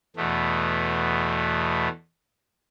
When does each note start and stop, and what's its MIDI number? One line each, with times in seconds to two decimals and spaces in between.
0.16 1.88 40
0.16 1.88 47
0.16 1.88 57